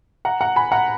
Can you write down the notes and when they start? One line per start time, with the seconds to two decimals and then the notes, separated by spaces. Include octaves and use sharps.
0.25 F#5 A#5
0.41 F#5 A#5
0.56 G#5 B5
0.72 F#5 A#5